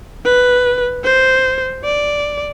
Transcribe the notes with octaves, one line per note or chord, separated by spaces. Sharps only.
B4
C5
D5